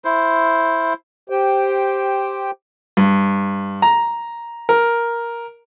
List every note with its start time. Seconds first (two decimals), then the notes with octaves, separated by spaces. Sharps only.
0.05 E4 C5
1.30 G4 C5 G5
2.97 G2
3.82 A#5
4.69 A#4